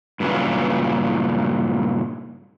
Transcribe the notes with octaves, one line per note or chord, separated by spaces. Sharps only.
G2 A#2 C#3 E3 F#3